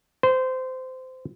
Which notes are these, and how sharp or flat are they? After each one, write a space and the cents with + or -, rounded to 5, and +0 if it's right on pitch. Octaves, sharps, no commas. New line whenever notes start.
C5 -20